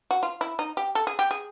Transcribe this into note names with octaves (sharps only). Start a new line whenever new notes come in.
F#4
F4
E4
D#4
G4
A4
G#4
G4
G#4